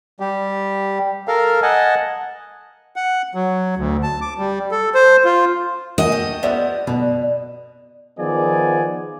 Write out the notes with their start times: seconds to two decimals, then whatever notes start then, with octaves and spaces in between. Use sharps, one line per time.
0.20 G3 G4
1.28 A4 A#4 F5
1.62 D#5 F#5 G#5 A5
2.96 F#5
3.35 F#3
3.77 D2
4.03 A5
4.21 D6
4.38 G3
4.71 A4
4.94 C5
5.25 F4
5.98 A#3 F#4 G#4 D#5
6.12 A3 G5
6.43 F3 G3 B3 D5 E5 F#5
6.87 B2 D3
8.19 D#3 F3 B3 G#4 D5 G#5